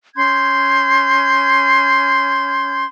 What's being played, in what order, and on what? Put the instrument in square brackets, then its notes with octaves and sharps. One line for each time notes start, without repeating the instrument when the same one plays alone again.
[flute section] C#4 C6 G6 G#6